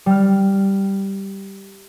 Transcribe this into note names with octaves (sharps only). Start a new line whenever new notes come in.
G3 F6